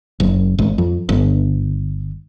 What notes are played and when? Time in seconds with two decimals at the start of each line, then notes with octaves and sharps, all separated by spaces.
0.20 F#1
0.59 G#1
0.78 F2
1.09 G1